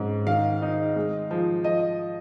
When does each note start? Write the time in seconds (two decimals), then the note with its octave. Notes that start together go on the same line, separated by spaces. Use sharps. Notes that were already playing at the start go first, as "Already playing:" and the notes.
Already playing: G#2 C#4
0.27 D#3 F5
0.62 D#4
0.96 G#3
1.31 F3
1.64 F3 D#5